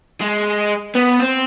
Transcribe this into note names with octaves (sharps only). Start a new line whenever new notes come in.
G#3
B3
C4